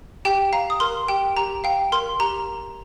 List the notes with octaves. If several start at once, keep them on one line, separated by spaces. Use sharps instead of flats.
G4 G5
F5 A#5
D#6
A#4 C6
G4 G5
G4 A#5
F5 G5
A#4 C6
G4 A#5